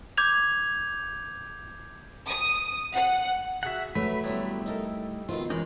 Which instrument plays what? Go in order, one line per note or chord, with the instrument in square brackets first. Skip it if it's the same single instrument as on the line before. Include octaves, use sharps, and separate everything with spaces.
[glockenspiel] D6 G6 G#6 F7
[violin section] D#6
F#5
[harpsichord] F#4 G#4 A#5 [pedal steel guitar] E5 F#5
[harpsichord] F#3 [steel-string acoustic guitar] A3 [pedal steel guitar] B4
[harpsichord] D3 F#3 B3 [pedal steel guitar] G3 E4
[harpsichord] D#4 A4 A#4
[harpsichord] B2 D#3 C4 [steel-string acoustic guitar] F4
[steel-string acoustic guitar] E2 [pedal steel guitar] G#3 C#4 D#4 [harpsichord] A#4 B5